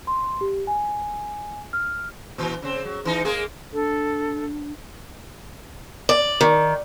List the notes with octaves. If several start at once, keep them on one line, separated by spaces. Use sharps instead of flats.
C6
G4
G#5
F6
A#2 E3
C#3 C4
F#3
E3 D#4
G#3 A#3 G#4
D4 A4
D5
D#3